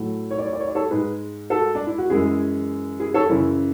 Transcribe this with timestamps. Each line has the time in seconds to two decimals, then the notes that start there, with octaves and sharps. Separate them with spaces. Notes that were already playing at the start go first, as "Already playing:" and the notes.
Already playing: A2 F#3 A3
0.31 C#5
0.38 D5
0.46 C#5
0.53 D5
0.60 C#5
0.67 D5
0.75 A4 C#5
0.90 G#2 G#3 G#4 B4
1.50 F#4 A4
1.75 D4
1.87 E4
1.98 F#4
2.10 F#2 E3 G#3 E4 G#4
3.00 E4 G#4
3.14 A4 C#5
3.29 F#2 C#3 E3 C#4 E4